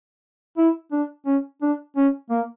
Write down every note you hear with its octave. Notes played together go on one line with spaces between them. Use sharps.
E4
D4
C#4
D4
C#4
A#3